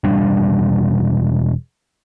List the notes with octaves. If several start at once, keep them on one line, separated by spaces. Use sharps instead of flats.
E1 G3 D4